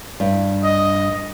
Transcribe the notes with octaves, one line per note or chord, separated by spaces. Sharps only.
G2
D#5